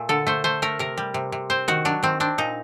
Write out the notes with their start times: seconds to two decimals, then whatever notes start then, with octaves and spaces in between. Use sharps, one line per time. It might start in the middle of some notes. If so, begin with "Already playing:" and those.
Already playing: A#2 A3
0.09 D3 A4
0.27 A3 C5
0.44 A3 C5
0.62 A3 A#4
0.79 C3 A#4
0.98 G3
1.14 C3
1.32 C3
1.50 C4 C5
1.68 D#3 F#4
1.85 F#3 D4
2.03 D#3 C4
2.20 C4 D4
2.38 A#2 D#4